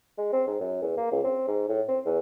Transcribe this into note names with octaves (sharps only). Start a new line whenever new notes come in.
G#3
C4
G#2
F#2
E2
A#3
C#2
C4
G#2
A2
C4
E2